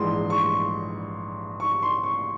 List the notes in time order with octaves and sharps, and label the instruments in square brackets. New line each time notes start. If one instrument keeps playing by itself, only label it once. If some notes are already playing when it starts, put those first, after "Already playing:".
Already playing: [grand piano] A#1 G#2 E3 G#3 C6
C#6
C#6
C6
C#6